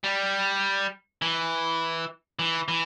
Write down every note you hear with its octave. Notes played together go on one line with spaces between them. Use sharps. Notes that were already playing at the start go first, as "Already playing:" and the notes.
G3
E3
E3
E3